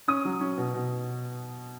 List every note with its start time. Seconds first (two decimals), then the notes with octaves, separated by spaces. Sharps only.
0.08 C#4 D#6
0.25 F#3
0.41 C#4
0.57 B2
0.74 B2